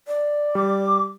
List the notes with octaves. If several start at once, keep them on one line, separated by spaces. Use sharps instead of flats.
D5
G3 D6